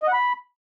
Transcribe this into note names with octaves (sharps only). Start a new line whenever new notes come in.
D#5
F#5
B5